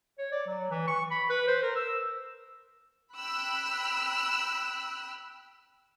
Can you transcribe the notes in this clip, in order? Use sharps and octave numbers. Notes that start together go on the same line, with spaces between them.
C#5
D5
F#3
E3
C#6
B5
B4
C5
A#4
E6
G5 B5 E6 F#6